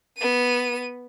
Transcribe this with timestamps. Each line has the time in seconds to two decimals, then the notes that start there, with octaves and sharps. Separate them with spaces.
0.17 B3 D#7